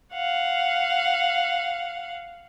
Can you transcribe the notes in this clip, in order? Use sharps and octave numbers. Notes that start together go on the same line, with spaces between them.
F5 F#5